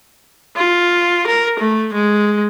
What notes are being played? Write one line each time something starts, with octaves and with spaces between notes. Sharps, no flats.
F4
A#4
A3
G#3